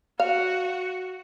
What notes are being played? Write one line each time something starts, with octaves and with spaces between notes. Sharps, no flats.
F#4 F5